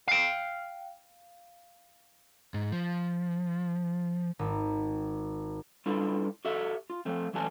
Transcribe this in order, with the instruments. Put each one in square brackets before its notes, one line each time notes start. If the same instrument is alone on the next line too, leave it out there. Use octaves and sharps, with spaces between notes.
[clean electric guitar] F5 G5
[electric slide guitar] G#2
F3
[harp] G#1
[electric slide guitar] G3 D4 E4 F4 A4 B4
F#4 G4 A4 E5
F4
F3 A3 C4
F#2 E3 A3 G4 G#5 A5